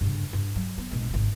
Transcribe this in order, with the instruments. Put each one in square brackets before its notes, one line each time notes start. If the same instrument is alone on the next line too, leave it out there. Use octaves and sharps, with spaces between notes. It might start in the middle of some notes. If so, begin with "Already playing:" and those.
[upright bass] G2 C#3
G2 E4
F#3
B3
A#1 G#3
G#1 D3